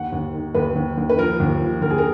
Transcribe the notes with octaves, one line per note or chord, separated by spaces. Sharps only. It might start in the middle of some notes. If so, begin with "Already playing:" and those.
Already playing: D#2 F#5
D#2
D#3
D#2 B4
D#2
D#2
B4
F3 A#4
D#2
F3
D#2 A#4
G#4
A#4